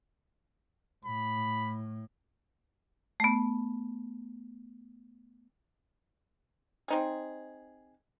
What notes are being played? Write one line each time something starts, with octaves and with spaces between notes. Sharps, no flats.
A2 B5
A3 B3
C4 D#4 G#4